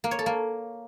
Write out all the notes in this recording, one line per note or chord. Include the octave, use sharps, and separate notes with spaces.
A#3
C#5
A4
A#3